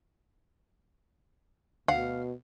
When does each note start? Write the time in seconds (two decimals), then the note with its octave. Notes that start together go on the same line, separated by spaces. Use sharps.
1.88 D2 B2 F5 F#5